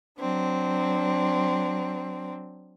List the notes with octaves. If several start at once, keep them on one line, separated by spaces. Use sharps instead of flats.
F#3 C4 D4